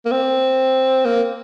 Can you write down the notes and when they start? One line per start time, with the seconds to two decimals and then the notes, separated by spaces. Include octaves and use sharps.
0.05 A#3
0.11 C4
1.05 A#3